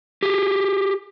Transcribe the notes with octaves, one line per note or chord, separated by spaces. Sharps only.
G4 G#4